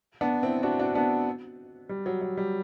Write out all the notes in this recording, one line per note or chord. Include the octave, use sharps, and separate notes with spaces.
B3 D4
C4 E4
D4 F#4
D4 F#4
B3 D4
G3
F#3
F#3
G3